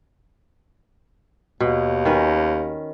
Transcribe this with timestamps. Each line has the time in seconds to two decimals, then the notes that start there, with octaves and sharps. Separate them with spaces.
1.60 D#2 B2
2.05 D#3 C#4 B4